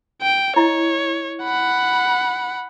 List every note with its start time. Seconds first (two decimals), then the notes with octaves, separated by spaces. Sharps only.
0.22 G5
0.56 E4 C#5 D#5
1.43 F#5 B5